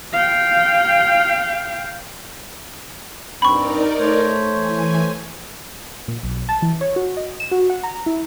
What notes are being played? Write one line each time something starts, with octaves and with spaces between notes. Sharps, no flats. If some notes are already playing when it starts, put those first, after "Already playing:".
F5 G5
G2 C4 D#4 A#4 D5 B5 C#6
A3 C5 C#5
E3 G#5
A#2
B1
A5
E3
C#5
F#4
D#5
E7
F#4
F#5
A#5
E4